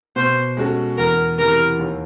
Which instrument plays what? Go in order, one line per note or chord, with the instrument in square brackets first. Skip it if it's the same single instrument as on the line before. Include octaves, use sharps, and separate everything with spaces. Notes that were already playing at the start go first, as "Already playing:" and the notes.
[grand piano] B2 [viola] C5
[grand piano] G#3 C#4 F#4 A4
[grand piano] E2 [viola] A#4
[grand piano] C3 E3 [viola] A#4
[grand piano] D#2